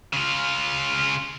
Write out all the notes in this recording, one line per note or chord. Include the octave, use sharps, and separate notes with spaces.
C#3 F4